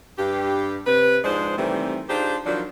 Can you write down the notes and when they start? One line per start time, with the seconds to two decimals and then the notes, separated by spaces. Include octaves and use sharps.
0.18 G2 G4
0.87 C3 B4
1.24 G#2 F3 G#3 D4 C5
1.57 C3 D#3 E3 G3 A3 C4
2.09 D4 D#4 F4 G4 G#4 C5
2.46 D#3 F3 F#3 D4